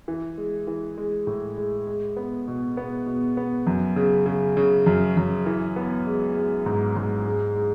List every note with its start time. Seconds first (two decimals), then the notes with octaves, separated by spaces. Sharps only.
0.08 E3
0.38 G#3
0.67 E3
0.98 G#3
1.27 A2
1.58 G#3
1.87 G#3
2.17 B3
2.48 B2
2.77 B3
3.06 B2
3.37 B3
3.67 F#2
3.96 C#3
4.26 C#3
4.57 C#3
4.86 F#2
5.17 F#2
5.46 E3
5.76 B3
6.07 G#3
6.35 G#3
6.66 G#2
6.96 G#2
7.26 G#3
7.55 G#3